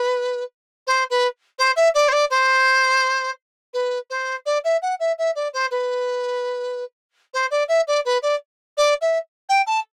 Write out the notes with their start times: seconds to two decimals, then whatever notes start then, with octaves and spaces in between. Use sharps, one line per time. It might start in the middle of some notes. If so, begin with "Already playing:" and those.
Already playing: B4
0.87 C5
1.10 B4
1.58 C5
1.76 E5
1.94 D5
2.08 C5
2.12 D5
2.30 C5
3.73 B4
4.10 C5
4.46 D5
4.64 E5
4.82 F#5
5.00 E5
5.18 E5
5.35 D5
5.53 C5
5.71 B4
7.34 C5
7.51 D5
7.68 E5
7.87 D5
8.05 B4
8.22 D5
8.77 D5
9.01 E5
9.49 G5
9.66 A5